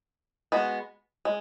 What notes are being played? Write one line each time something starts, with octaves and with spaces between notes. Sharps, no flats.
G#3 B3 F#4
G#3